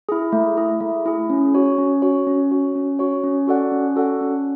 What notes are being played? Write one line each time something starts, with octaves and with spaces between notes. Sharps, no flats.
E4 G#4
A3
E4 G#4
A3
E4 G#4
C#4
F#4 C#5
C#4
F#4 C#5
C#4
F#4 C#5
C#4
F#4 C#5
C#4
F#4 A4 D5 F#5
C#4
F#4 A4 D5 F#5
C#4